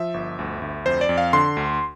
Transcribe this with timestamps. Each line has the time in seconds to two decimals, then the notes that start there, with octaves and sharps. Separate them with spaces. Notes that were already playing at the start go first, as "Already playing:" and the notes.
Already playing: F3 E5
0.14 G1
0.39 D2
0.62 D2
0.86 F2 C5
1.01 D5
1.09 F2
1.18 F5
1.33 D3 C6
1.57 D2